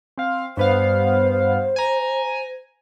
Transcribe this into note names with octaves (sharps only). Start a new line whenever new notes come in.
C4 F5
G2 B3 C5 F5
G#5 A#5